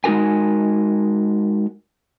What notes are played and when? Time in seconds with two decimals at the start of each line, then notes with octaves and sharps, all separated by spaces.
0.04 G#3 D#4 F#4 A#4 G#5